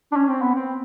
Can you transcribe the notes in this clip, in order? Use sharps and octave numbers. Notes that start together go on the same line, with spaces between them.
D4
C#4
C4
B3
C4